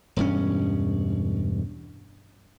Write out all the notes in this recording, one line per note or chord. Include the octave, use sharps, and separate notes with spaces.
E1 G2 C#4